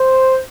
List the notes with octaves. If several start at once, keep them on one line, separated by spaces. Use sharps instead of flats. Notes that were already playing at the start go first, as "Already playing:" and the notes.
Already playing: C5